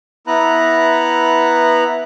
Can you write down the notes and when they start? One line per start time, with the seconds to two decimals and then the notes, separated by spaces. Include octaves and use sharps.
0.27 B3 E4 B4 A#5 F#6